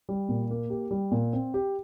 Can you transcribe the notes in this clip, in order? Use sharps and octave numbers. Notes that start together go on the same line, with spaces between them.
G3
A#2
A#3
G4
G3
A#2
C4
G4